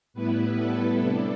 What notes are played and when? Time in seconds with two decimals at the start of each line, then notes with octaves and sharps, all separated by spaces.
0.14 A2 G3 B3 E4 B4
0.56 A4
0.99 C3 G3 D4